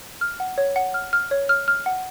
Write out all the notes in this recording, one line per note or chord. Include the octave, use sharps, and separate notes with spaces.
F6
F#5
C#5
F#5
F6
F6
C#5
F6
F6
F#5